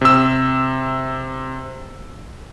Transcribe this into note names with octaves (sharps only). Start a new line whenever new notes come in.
C3 E6